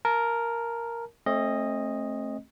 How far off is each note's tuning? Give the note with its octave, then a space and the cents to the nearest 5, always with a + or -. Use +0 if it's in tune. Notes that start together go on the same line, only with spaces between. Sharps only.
A#4 +0 A5 -25
A3 +0 C4 +40 D#5 +0